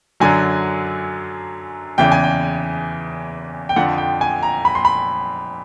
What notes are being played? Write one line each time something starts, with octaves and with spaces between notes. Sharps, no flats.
F#2 D3 F#3 G#5
E2 C#3 E3 G5
G#5
G5
G5
F2 D3 F3 F#5
G5
G#5
A#5
B5
C6
B5